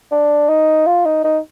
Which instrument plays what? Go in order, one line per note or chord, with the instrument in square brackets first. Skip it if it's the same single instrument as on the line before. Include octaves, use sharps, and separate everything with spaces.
[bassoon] D4
D#4
F4
D#4
D#4